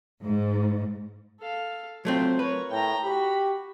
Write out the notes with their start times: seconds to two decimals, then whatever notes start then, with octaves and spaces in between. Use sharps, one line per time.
0.22 G#2
1.40 A4 F5
2.05 F#3 A3 C4 F4 C5
2.39 A#4 B4 C#5
2.71 A2 G5 A#5
3.04 F#4 G4 B5